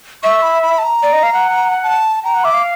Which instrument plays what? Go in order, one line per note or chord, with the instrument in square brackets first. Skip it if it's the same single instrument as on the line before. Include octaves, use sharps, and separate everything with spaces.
[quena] E5 [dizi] C#6
[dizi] B5
B5
A5
A#5
[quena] D5
D#5
F5
F#5
[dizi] A5
[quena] G5 [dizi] A#5
[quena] F#5
[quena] E5 [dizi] D6
[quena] F5